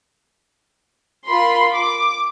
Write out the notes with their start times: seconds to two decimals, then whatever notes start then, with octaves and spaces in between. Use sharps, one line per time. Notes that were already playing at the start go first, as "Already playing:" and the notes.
1.27 F4 A#4 B5 C6
1.74 D6